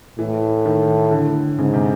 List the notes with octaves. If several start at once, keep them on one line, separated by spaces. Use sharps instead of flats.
A2 E3
D#3
D3
G#2 C#3
C3